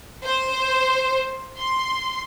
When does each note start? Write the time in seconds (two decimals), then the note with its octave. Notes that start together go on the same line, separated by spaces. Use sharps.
0.25 C5
1.57 C6